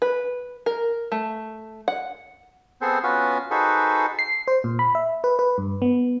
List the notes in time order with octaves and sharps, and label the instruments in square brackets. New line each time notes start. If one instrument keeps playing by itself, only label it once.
[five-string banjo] B4
A#4
A3
F#5
[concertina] B3 C4 G#4 A4 C5
B3 C#4 F4 F#4 B4
D#4 F#4 G#4 A4 B4 C5
[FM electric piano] C7
C5
A#2
B5
E5
B4
B4
G2
B3